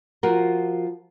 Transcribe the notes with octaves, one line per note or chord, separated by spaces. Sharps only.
F3 F4 F#4 A#4